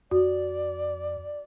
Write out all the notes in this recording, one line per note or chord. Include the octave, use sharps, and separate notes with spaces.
F2 F#4 D5